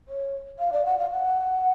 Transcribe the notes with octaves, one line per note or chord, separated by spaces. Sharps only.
C#5
F5
D5
F#5
F5
F#5